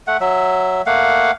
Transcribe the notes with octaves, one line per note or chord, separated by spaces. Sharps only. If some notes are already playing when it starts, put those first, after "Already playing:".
A3 F#5
F#3 E5
A3 A#3 F5 F#5